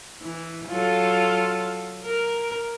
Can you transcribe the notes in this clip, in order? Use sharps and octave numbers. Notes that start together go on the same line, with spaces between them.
E3
F#3 F4 A4
A#4